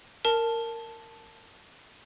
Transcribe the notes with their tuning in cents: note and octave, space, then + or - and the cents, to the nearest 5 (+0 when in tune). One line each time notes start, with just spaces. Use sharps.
A#4 -15 A5 +0